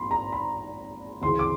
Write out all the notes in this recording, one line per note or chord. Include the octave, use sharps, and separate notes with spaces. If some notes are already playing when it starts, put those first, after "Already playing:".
Already playing: A#1 G#2 B5 C6
A#5
B5
D2 C#3 E3 C6
D6